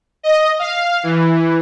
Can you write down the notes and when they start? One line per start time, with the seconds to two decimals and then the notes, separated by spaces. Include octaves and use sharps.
0.23 D#5
0.59 F5
1.03 E3